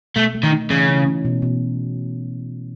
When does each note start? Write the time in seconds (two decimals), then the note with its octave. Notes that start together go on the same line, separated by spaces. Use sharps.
0.16 B2 A3
0.34 A3
0.43 D#3
0.53 D#4
0.70 C#3 E3
0.89 C#4
1.07 C#4
1.25 B2
1.42 B2